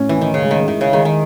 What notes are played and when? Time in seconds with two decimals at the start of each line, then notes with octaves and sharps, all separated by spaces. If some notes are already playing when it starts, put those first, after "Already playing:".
Already playing: A2 C#4
0.09 E3
0.18 D#3 C#4
0.34 C#3
0.43 G#3
0.51 D#3
0.68 D#3 E4
0.81 C#3
0.93 D#3 G#3
1.05 D#3